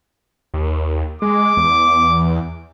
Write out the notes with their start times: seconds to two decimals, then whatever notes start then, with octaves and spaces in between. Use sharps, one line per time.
0.54 D#2
1.22 G#3 D6
1.57 E2